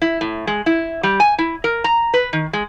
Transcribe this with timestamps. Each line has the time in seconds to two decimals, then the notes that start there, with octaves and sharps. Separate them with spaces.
0.02 E4
0.21 A2
0.47 G#3
0.66 E4
1.03 G3
1.20 G#5
1.38 E4
1.64 A#4
1.84 A#5
2.14 B4
2.33 D#3
2.53 G#3